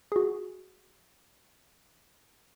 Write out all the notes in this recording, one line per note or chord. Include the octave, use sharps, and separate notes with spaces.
F#4 G#4